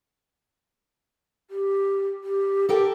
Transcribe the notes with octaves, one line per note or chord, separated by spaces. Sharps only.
G4
G4
G4 A4 A#4 G5